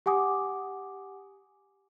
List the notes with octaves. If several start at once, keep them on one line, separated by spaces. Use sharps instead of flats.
G4 F#5 G#5 D6 D#6